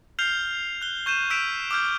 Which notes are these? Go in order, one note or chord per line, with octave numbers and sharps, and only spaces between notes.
F6 G6 C7 F7 G7
F#6 G7
C#6 G6 D#7 E7
E6 G6 B6 D7 E7 F7
D6 E6 F6 G6